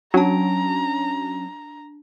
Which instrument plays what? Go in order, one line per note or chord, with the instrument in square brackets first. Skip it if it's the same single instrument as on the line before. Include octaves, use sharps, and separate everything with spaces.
[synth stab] F#3 [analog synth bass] C#4 [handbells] D4 A5 [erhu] A#5